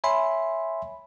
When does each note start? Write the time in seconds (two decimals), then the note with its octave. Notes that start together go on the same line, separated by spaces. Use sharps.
0.04 C#5 E5 G#5 B5 C6